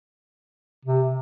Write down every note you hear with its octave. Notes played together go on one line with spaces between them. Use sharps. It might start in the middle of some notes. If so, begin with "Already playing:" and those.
C3